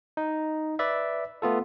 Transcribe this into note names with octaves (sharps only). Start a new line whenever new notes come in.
D#4
B4 D5 E5
A3 B3 F4 A4